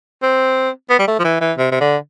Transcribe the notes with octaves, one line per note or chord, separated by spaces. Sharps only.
C4
B3
G3
A3
F3
E3
E3
C3
C3
D3